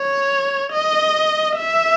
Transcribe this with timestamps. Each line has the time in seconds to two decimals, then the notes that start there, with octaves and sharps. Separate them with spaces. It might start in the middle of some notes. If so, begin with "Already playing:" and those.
Already playing: C#5
0.73 D#5
1.58 E5